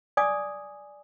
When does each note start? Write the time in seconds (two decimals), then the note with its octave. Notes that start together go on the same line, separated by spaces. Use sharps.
0.17 D5 G#5 D6 D#6